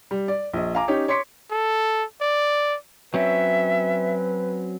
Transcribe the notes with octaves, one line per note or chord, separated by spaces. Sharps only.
G3
D5
A#1 D#5
F5 G#5 A#5 D6
C#4 D#4 G4 C#5
C#5 C6 D6 B6 C#7
A4
D5
F#3 C4 C#4 B4 E5